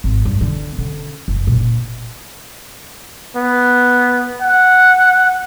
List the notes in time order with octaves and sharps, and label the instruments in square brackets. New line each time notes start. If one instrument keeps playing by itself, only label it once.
[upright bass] G#1
G2
D3
D3 C#4
F#1
A#2 D3
[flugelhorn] B3
F#5